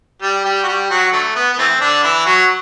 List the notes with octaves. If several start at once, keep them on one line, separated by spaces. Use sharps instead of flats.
G3 G4
G3 G4
F#4
G3 G4
F#3 F#4
D3 F#3 A3
B3
B3
E3 A3 C4
D3 D4
E3 E4
F#3 F#4